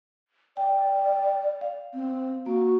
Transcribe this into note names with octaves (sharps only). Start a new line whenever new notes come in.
D5 G5
F5
C4
A#3 F#4